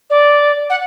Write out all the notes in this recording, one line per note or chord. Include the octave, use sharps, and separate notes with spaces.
D5
F#5